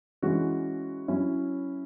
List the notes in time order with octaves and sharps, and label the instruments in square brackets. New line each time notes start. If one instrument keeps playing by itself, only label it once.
[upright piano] E3 G#3 C#4 F#4
F#3 C#4 E4